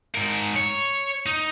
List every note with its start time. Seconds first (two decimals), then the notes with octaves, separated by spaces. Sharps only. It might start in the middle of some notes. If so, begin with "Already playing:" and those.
0.15 G#2 A#4
0.56 C#5
1.26 D#4